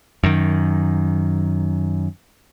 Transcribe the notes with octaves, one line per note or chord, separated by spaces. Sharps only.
F#2 D#3